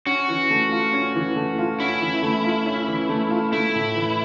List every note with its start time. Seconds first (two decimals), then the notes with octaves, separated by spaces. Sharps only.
0.06 C#4 F#4
0.29 E3
0.50 A3
0.71 F4
0.93 C#4
1.15 E3
1.36 A3
1.58 F4
1.80 C#4 E4
2.01 E3
2.22 A3
2.44 F4
2.66 C#4
2.88 E3
3.09 A3
3.30 F4
3.52 A3 E4
3.75 A2
3.95 E3